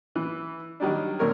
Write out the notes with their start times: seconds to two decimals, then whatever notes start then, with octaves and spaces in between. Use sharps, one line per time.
0.15 E3
0.80 D#3 F#3 G3 D4
1.19 D2 A#2 A#4 C#5